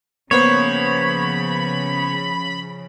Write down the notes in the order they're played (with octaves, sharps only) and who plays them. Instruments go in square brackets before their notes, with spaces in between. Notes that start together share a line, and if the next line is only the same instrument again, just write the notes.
[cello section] C#3 F3 [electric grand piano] A#3 B3 C5 [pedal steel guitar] C#5 [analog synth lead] B5